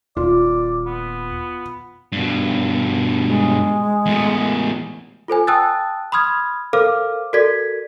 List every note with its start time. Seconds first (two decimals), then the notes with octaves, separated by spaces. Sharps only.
0.17 D#1 F4 D5
0.86 B3
2.12 G2 B2
3.26 G#3
4.06 E2 A2
5.28 F4 A4 C5 G#5
5.47 G5 A5 D#6 E6 F#6 A6
6.12 B5 C6 D#6 F6 G#6
6.73 A4 A#4 C5 F5 D6 F6
7.33 F#4 A4 A#4 D5 G#6 B6